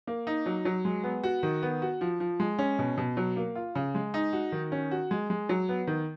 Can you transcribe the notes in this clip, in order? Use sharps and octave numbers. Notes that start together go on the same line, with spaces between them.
A#3
D#4
F#3
F#3
G#3
B3
F#4
D#3
B3
F#4
F3
F3
G#3
C#4
B2
B2
F#3
A#3
F4
C#3
G#3
D#4
F#4
D#3
C#4
F#4
G#3
G#3
F#3
B3
D#3